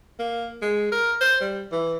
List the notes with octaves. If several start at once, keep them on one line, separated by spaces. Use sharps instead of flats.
A#3
G#3
A#4
C5
G3
E3